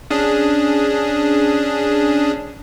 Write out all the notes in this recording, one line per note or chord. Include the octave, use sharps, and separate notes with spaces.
C#4 D4 G#4